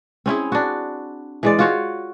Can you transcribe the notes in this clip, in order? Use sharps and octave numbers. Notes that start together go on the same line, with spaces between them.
C4 C#4 E4 G#4
D4 F#4
E3 G#3 D5
F4 F#4 C#5